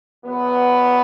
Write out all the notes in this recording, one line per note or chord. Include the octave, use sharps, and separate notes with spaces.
E2 B2 F#3 B3